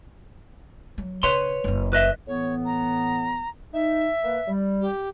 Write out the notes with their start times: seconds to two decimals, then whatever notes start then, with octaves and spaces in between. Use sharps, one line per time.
0.98 F#3
1.23 C#3 B4 C#5 C6
1.64 F#1 C#4
1.93 B4 D#5 E5
2.28 A2 E3 B3 C#5
2.65 A#5
3.73 D#4 E5
4.23 A#3 B4
4.48 G3
4.81 G4